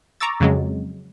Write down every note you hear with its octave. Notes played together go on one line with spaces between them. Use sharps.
A#5 C#6 D6 E6 A6
F2 C#3 F#3 G#3